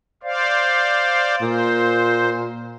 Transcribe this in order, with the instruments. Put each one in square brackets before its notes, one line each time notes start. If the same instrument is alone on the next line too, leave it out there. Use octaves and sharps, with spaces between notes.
[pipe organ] C5 D5 F5
[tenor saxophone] A#2 [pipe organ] C5